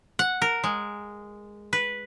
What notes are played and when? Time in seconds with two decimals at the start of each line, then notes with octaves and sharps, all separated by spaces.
0.19 F#5
0.42 A#4
0.64 G#3
1.73 B4